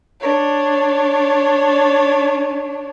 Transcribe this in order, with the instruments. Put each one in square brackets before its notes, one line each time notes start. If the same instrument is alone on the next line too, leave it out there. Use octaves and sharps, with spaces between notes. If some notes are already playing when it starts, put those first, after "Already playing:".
[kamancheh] D4 C#5